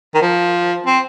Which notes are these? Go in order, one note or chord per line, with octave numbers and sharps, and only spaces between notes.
D#3
F3
C4